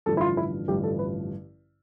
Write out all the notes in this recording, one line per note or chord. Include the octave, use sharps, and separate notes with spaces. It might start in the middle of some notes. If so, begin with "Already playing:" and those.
A1 G2 D3 F3 A4
E4
F4
E4
A1 G2 D3 F3 G4
A4
B4